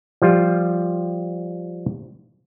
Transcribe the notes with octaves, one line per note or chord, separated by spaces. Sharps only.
F3 G3 F4